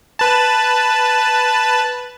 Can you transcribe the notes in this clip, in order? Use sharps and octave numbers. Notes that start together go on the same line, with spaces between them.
B4 A5